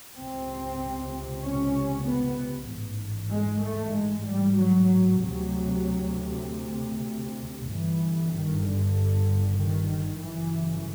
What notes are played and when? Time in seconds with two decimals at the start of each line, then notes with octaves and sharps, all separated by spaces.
0.18 C#2 C3 C4
1.43 C#4
2.06 B3
2.69 A1 G#2
3.32 G#3
3.63 A3
3.94 G#3
4.26 G3
4.57 F#3
5.20 D2 C3 F#3
7.71 G1 G2 E3
8.34 D#3
8.65 D3
9.59 D#3
9.91 D#3
10.22 G1 F#2 C#3 E3